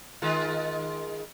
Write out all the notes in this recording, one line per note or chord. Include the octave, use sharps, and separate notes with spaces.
D#3 G#3 F4